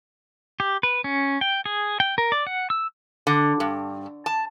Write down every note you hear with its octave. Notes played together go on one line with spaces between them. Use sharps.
G4
B4
C#4
G5
G#4
G5
A#4
D5
F#5
E6
D3
G2
A5